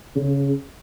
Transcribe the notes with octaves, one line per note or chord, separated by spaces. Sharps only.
C#3